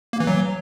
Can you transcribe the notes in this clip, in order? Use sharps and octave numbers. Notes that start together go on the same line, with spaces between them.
A#3
E3
F#3